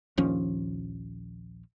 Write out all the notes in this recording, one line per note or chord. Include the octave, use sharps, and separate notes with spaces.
A#1 D#2 F3 C#4